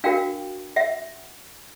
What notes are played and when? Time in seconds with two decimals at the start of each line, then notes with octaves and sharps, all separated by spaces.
0.04 D4 F#4 A#4 F5 G5
0.76 E5 F#5